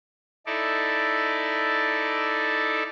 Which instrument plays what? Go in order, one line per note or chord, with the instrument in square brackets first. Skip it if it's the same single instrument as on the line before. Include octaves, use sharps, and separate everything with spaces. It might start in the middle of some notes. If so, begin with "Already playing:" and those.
[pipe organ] D#4 E4 A4 D5